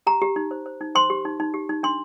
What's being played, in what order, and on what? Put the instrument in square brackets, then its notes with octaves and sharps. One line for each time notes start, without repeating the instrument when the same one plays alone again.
[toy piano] G4 A#5
G4
D#4
C5
C5
D#4
C5 C6
G4
D#4
D#4
G4
D#4
D4 C6